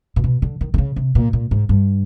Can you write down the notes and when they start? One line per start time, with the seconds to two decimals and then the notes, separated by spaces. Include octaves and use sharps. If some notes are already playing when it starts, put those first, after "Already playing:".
0.16 A#2
0.24 B2
0.42 D3
0.61 D#3
0.74 D3
0.78 C#3
0.96 C3
1.15 A#2
1.33 A#2
1.51 G#2
1.69 G2